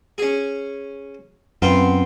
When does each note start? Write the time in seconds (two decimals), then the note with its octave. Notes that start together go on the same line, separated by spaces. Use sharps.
0.18 C#4 G#4
1.62 F#2 B3 C4 F4